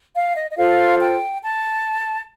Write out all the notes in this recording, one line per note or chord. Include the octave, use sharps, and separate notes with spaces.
F5
D#5
D#5
F4 A4 C5 F5
G5
A5